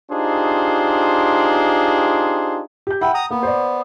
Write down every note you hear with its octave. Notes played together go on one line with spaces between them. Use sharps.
D4 D#4 F4 G4 G#4 C5
G4 G6
E4 F#5 G5
A#5 D#6
A#3 B3
C5 D5